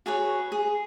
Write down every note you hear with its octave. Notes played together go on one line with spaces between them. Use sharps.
F#4 G#4 B4 C#5
G#4